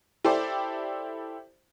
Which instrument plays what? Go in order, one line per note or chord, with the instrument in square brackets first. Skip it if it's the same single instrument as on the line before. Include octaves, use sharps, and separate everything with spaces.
[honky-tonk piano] E4 G4 A4 C5 D5